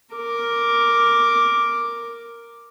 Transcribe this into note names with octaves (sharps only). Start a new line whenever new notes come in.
A#4 D6